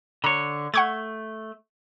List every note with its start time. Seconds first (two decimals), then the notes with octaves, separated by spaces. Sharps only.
0.24 D3 C#5 A#5
0.74 A3 F#5 C#6 G#6